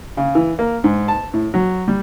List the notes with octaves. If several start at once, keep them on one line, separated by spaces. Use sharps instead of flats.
C#3
E3
A#3
G#2
A5
A2
F#3
G3